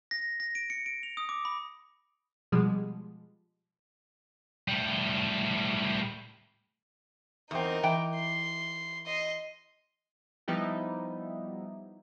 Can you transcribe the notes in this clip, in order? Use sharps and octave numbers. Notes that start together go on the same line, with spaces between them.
A#6
A#6
D7
C#7
D7
F7
D#6
D6
B5
B2 F3 G3 G#3
A2 G3
E2 C4 D#4 A#4
E3 G5
C6
D#5 C6
F3 G3 B3 D#4 E4 G4